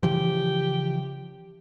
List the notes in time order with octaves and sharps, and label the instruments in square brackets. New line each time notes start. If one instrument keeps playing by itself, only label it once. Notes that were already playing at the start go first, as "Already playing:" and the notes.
[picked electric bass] C#3 E3 F3 [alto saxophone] G4